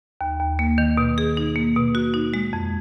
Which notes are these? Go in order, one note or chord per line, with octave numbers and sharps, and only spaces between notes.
D#2
D#2
A#3
D#3
B2
G#4
D#4
A#3
B2
F#4
D#4
G#3
F2